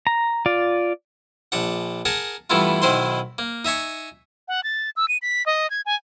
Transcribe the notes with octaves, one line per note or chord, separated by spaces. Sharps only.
A#5
F4 D5
A#1 D4 F#5
G#4 A#4 F#5 A5
G2 E3 A3 B3 E4 F4
B1 D#3 E4 C5 C6
A#3
D#4 E5 G#5 C#6
F#5
A6
E6
D#7
B6
D#5
G#6
G#5